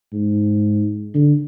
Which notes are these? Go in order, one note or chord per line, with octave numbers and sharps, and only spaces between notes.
G#2
D3